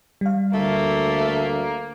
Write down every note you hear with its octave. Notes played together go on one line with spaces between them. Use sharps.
G3 F5
D2 A3 A#3